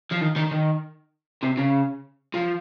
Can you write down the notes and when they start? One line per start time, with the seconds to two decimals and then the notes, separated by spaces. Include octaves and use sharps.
0.12 F3
0.22 D#3
0.36 D#3
0.51 D#3
1.43 C3
1.58 C#3
2.34 F3